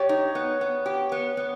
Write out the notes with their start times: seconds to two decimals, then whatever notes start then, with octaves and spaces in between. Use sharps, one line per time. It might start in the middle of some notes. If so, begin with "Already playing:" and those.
Already playing: G4 C#5
0.09 D#4
0.35 B3
0.61 B3
0.86 G4
1.12 B3
1.37 B3